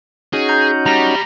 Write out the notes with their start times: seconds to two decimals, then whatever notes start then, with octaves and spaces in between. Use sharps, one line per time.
0.33 C#4 D#4 F#4 G#4
0.49 A#5 G6
0.86 G3 A#5 A#6